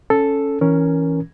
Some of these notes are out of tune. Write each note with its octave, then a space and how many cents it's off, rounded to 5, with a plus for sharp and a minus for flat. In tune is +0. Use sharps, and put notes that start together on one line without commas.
C#4 +0 A4 +0
E3 -15 C#4 +0 A#4 +0